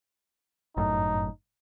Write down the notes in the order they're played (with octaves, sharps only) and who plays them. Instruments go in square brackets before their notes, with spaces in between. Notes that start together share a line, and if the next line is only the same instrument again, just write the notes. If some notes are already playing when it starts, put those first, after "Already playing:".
[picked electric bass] G1 F#2 A2 [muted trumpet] D#4